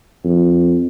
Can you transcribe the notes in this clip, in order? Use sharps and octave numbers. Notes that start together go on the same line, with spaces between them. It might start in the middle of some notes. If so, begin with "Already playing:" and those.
F2